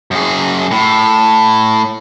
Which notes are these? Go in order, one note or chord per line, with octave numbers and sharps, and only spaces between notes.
F#2 G#4
A2